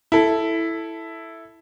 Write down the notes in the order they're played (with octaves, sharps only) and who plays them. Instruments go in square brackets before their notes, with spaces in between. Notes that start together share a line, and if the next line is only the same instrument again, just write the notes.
[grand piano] E4 A4